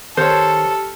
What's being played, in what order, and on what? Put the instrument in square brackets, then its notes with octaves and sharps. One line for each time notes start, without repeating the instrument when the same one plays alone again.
[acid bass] D#3 [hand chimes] G4 F6 C#7 [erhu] A4 [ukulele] C5 C#5